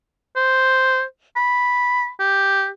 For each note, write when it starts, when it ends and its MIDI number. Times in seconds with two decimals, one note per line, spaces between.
0.36 1.03 72
1.36 2.09 83
2.20 2.68 67